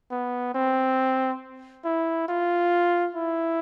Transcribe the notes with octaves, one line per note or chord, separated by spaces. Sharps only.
B3
C4
E4
F4
E4